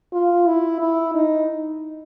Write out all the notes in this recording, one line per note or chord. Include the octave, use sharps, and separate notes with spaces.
F4
E4
E4
D#4